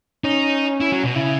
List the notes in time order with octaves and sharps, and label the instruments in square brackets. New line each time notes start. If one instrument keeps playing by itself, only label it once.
[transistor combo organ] C#4 [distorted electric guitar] D#4
[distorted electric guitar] E4
F#3
B2
[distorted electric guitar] C#3 [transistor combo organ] E4